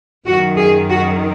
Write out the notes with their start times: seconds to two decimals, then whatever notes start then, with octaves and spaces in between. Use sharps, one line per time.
0.25 F#2 D#3 F#4
0.57 G#4
0.88 F#4